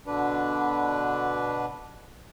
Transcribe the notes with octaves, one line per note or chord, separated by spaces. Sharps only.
B2 D3 D4 B4